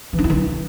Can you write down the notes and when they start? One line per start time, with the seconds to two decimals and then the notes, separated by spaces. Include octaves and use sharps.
0.13 E3
0.19 D4
0.24 E4
0.30 E3